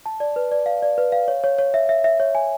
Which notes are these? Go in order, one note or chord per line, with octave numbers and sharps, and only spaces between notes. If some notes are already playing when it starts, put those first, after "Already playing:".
A5
D5
B4
D5
F5
D5
B4
F5
C#5
C#5
C#5
E5
E5
E5
C#5
G#5